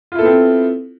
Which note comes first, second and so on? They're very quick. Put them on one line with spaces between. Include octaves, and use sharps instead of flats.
F4 E4 A4 B3 C4